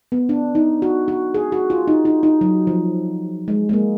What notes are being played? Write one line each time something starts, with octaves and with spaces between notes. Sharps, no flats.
B3
D4
D#4
F#4
F#4
G#4
F#4
F4
D#4
D#4
D#4
F#3
F3
G#3
G#3
A#3